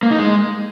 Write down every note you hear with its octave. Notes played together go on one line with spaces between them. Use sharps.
A#3
D#4
G#3